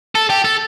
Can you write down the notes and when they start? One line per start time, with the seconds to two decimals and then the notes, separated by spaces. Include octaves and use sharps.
0.15 A4
0.30 G4
0.45 A4